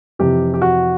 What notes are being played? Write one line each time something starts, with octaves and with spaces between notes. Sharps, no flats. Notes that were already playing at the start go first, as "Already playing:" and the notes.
F2 C3 E3 G4
G4
F#4